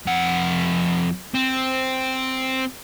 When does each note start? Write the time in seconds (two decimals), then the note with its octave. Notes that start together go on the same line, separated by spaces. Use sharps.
0.07 F2 F#5
1.34 C4